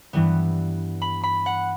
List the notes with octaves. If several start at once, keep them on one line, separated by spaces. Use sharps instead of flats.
G2 E3 G3 B3
B5
B5
F#5